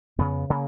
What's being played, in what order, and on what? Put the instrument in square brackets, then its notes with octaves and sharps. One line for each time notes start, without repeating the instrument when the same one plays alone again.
[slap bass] F2 C#3 B3
C#3 A#3